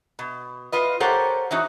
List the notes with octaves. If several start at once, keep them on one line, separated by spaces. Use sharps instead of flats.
B2
F4 B4 D#5
G4 A4 A#4 C5 C#5 F#5
E3 C#4 D#4 F#4